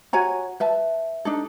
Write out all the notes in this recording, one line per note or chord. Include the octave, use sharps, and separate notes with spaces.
F#4 C#5 G#5 A#5
B4 E5 A5
D4 D#4 A4